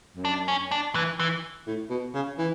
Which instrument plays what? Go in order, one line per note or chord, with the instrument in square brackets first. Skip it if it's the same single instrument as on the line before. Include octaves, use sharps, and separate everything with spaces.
[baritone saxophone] F#2
[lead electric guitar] D4
C#4
D4
E3
E3
[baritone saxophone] A2
B2
C#3
E3